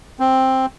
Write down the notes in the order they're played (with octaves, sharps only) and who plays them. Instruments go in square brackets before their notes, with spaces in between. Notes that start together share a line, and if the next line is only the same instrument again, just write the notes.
[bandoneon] C4